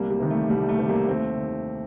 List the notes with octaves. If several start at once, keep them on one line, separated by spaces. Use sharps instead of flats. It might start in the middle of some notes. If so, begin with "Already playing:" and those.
Already playing: C2 G3 A#3
G3
C3 D#3
A3
C2 G3
A3
C3 D#3
G3 A#3
D#2 A3 C4
D#3